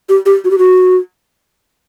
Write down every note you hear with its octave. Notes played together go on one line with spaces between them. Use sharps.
G4
G4
F#4
G4
F#4